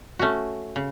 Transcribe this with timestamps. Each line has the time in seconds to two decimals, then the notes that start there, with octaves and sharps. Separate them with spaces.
0.19 A3 C#4 F#4
0.76 C#3